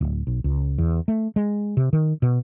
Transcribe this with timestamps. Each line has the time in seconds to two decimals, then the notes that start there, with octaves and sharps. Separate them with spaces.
0.01 D1
0.27 B1
0.44 C#2
0.78 E2
1.08 A3
1.36 G#3
1.77 C3
1.93 D#3
2.22 B2